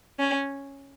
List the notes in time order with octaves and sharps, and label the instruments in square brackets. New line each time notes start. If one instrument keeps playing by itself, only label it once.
[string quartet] C#4